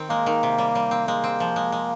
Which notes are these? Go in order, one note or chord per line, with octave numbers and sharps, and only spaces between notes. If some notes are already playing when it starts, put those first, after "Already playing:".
Already playing: D#3 C4
G#3 A#3
D#3
C3
G3
G3
C4
G#3 A#3
C4
F3
G#3
G#3